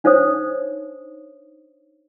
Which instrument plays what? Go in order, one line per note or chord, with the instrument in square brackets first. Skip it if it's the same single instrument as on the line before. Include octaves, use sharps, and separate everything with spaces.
[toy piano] D4 D#4 C5 C#5 D#6